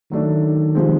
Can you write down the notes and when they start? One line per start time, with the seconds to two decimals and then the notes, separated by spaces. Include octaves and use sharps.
0.11 D#3 F#3 A3 D4
0.75 C3 F3 G#3 C4